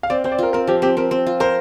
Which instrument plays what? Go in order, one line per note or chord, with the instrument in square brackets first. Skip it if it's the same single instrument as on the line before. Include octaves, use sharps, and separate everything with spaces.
[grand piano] F5
[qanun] C4 [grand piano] D5
[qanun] C4 [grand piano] C5
[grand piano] D5
[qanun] F4 [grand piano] A#4
[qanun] C4 [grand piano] A#4
[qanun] F3 [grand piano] G4
[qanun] C4 [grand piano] G4
[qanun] C4 [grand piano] A#4
[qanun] C4
F4
[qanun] A#4 [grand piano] C5